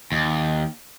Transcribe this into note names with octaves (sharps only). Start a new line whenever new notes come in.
D#2